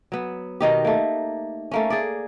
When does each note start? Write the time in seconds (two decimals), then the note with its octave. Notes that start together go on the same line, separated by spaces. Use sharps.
0.12 F#3 B3
0.61 B2 D#3 D#4 G4
0.85 A3 A#3
1.71 A3 A#3 C#4
1.90 G#4 D5